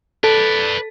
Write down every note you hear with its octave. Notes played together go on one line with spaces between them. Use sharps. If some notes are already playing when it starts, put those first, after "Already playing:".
A4 B4 D5